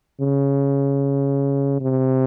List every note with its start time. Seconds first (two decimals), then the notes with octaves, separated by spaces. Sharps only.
0.21 C#3
1.81 C3